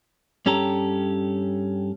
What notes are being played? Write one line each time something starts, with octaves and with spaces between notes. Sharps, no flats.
G2 C#4 G4 A4 A#5